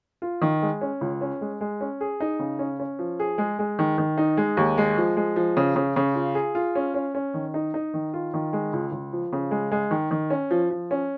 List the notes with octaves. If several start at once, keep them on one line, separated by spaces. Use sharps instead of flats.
F4
D#3
G#3
C#4
C#2
C#4
G#3
G#3
C#4
G#4
D#4
C#3
C#4
C#4
F3
G#4
G#3
G#3
D#3
D#3
D#4
G#3
D#2
G#3
F3
G#3
F3
C#3
C#3
C#3
F4
G#4
F4
C#4
C#4
C#4
D#3
D#4
D#4
D#3
F4
D#3
G#3
C#2
C#2
F3
C#3
G#3
G#3
D#3
D#3
C#4
F3
F3
C#4